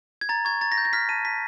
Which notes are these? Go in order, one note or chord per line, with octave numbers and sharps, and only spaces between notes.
G#6
A#5 A6
C#6 G#6
A#5 A6
A#6
G6
A#6
F6 B6
A5 D#7
A5 B6